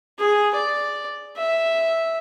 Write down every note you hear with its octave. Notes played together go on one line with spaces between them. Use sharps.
G#4
D5
E5